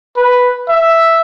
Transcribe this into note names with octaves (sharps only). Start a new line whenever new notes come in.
B4
E5